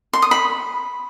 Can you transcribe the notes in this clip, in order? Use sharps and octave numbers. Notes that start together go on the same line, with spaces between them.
C6
D#6
B5